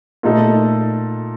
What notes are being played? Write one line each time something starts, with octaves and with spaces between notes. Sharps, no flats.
A#2 A3 D#4 A4